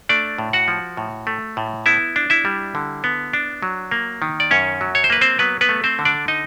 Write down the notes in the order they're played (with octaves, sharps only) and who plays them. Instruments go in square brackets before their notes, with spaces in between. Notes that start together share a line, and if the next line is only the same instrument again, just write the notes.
[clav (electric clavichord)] A3 D4 D5
A2
F#4 F#5
F3
A2
A3
A2
B3 E4 E5
D4
E4 E5
G3
D3
B3
D4
F#3
A#3
D#3
D5
F#2 C#4 C#5
F#3
C#5
C5
A#3 B4
C4 C5
F#3 B3 B4
B3 B4
A3
C4 C5
D3
D4 D5
D#4 D#5